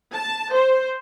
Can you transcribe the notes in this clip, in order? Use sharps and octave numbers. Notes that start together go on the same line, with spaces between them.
A5
C5